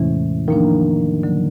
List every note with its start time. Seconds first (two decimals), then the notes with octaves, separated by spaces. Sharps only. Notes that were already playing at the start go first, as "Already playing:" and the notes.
Already playing: E2 A2 C3 E3 G#3 C#4
0.48 D#3 F3 A#3 D4
1.23 D3 F#3 A#3